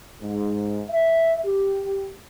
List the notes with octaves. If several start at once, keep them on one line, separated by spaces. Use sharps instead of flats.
G#2
E5
G4